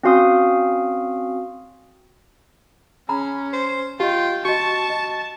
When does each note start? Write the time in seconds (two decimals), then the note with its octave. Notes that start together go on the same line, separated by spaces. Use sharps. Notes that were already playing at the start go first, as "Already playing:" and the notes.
0.03 C4 C#4 F#4 F5 C6 D#6
3.09 C#4 G#4 A#5 B5
3.53 C5
4.00 F4 G4 D#5 G5
4.45 F#4 D#5 A5 C#6
4.90 D#5